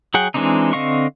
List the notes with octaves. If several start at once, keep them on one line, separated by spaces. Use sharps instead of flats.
F#3 G#4 F#5 G5
E3 G#3 C4 D4 D#4
D3 C4 D#5 F5 C#6